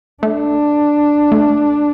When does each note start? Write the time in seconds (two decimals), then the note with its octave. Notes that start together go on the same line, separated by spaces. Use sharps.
0.23 A3 D4
1.32 A3